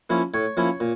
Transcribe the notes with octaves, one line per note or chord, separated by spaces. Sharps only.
F3 A#3 C#4 E4
A2 C#5
F3 A#3 C#4 E4
A#2